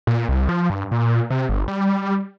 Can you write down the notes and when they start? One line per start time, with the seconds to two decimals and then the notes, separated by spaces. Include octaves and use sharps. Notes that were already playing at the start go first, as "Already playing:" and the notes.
0.07 A#2
0.29 C2
0.49 F3
0.70 G2
0.92 A#2
1.30 C3
1.49 G1
1.68 G3